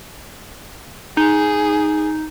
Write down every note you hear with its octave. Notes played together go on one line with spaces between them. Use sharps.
D#4 G#4